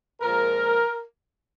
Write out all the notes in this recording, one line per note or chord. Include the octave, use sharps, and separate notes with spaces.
A#2 F3 G#3 A#4